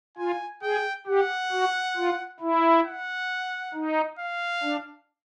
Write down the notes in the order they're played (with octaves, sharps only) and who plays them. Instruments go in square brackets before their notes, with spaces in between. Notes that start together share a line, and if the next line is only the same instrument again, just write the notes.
[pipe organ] F4 [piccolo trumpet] G#5
[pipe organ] G#4 [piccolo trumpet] G5
[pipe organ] G4 [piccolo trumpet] F#5
[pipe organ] F#4
F4
E4
[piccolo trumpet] F#5
[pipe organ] D#4
[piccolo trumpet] F5
[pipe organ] D4